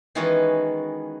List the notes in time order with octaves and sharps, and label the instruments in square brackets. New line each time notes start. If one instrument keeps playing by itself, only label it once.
[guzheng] D#3 E3 G#3 B3 C#4 F#4